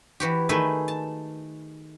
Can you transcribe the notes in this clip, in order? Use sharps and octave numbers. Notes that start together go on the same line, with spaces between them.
E3 F#4 G4
D#3 A3 G#4 B4 E5
A5